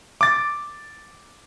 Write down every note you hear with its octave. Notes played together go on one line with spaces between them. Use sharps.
D6 A6